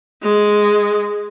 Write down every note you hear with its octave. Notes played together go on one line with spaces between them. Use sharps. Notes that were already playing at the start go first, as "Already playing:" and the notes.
G#3